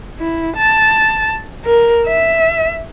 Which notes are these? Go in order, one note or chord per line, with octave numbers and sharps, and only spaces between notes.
E4
A5
A#4
E5